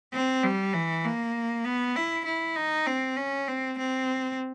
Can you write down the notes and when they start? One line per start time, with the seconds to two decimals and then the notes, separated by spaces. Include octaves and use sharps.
0.13 C4
0.43 G3
0.73 E3
1.04 A#3
1.65 B3
1.96 E4
2.25 E4
2.56 D#4
2.87 C4
3.17 C#4
3.48 C4
3.78 C4